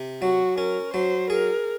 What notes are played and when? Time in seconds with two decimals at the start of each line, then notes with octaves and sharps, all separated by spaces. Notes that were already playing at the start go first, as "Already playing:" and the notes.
Already playing: C3
0.22 F#3 F#4
0.58 C#4 A#4
0.94 F#3 C5
1.30 G#4 A#4